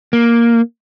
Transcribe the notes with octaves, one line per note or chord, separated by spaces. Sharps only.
A#3